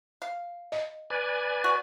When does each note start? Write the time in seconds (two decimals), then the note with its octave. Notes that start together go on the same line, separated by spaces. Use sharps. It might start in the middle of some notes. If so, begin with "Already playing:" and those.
0.22 F5
0.72 D#5
1.10 B4 D5 G#5
1.64 F#4